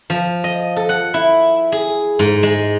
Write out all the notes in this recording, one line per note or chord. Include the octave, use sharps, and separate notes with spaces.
F3
D#5
A4
F#5
E4
G#4
G#2
G#3